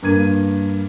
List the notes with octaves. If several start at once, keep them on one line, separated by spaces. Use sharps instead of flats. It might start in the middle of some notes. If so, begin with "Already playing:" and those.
G2 A#3 G#6 D#7